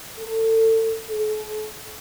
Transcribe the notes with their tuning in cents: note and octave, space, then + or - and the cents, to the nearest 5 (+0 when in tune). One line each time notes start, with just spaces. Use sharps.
A4 +30
A4 -45